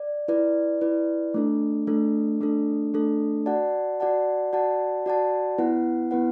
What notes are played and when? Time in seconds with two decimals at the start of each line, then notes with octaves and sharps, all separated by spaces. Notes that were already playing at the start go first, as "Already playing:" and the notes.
Already playing: D5
0.28 E4 B4 D5
0.81 E4 B4 D5
1.34 A3 D4 A4
1.87 A3 D4 A4
2.41 A3 D4 A4
2.94 A3 D4 A4
3.46 F#4 D5 F#5 A5
4.00 F#4 D5 F#5 A5
4.53 F#4 D5 F#5 A5
5.06 F#4 D5 F#5 A5
5.58 B3 E4 B4 F#5
6.11 B3 E4 B4 F#5